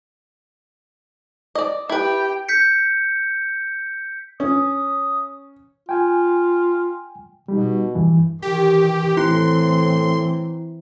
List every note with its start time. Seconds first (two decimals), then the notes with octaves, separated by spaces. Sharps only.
1.55 D5 D#5
1.90 E4 G4 B4 G5
2.48 G6 B6 C#7
4.40 C#4 D#6
5.89 F4 G5 G#5
7.48 B2 G3 D#4
7.95 G2 E3
8.42 D#3 E3 G4
9.17 A2 E3 C4 E4 C6